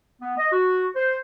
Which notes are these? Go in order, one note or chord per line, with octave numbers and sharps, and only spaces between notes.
B3
D#5
F#4
C5